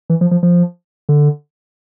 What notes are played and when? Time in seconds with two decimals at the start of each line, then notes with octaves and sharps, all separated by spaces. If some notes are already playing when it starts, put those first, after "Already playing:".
0.10 E3
0.21 F3
0.31 F3
0.43 F3
1.09 D3